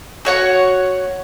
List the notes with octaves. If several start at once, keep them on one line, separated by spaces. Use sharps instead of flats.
F#4 C#5 F#5 C#6